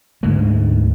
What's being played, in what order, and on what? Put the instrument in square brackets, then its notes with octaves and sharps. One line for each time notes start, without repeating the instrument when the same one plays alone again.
[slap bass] D2 G#2 D3 G#3